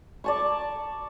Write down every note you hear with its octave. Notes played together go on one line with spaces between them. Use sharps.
D5 A5 C#6